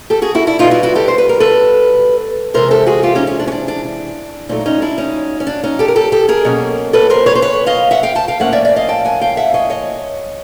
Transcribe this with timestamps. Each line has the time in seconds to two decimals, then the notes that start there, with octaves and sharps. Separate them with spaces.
0.10 G4 A4
0.22 F#4 G#4
0.35 E4 F#4
0.47 D4 E4
0.59 B2 G3 B3 D#4 F4
0.71 E4 F#4
0.83 E4 F#4
0.95 G4 A4
1.08 C5
1.18 B4
1.29 A#4
1.40 A4 B4
2.54 C3 E3 G#3 A#4 C5
2.71 G4 A4
2.87 F#4 G#4
3.03 F4 G4
3.15 C#4 D#4
3.27 C#4
3.39 D4
3.48 C#4
3.52 D4
3.68 D4
3.85 D4
4.49 A#2 F#3 A3 C#4 D#4
4.66 C#4 D#4
4.82 D4 E4
4.98 C#4 D#4
5.40 C#4
5.47 D4
5.63 C#4 D#4
5.79 G4 A4
5.88 A#4
5.96 G4 A4
6.12 G4 A4
6.28 G#4 A#4
6.44 B2 F#3 A#3 C#4
6.93 A4 B4
7.10 A#4 C5
7.26 B4 C#5
7.35 C5
7.42 B4 C#5
7.66 D#5 F5
7.91 E5 F#5
8.03 F5 G5
8.15 G5 A5
8.28 F5 G5
8.40 A2 F3 A#3 C#4 E5 F#5
8.53 D5 E5
8.65 D5 E5
8.76 D#5 F5
8.89 G5 A5
9.05 F#5 G#5
9.21 F5 G5
9.37 E5 F#5
9.54 C#5 D#5
9.70 C#5 D#5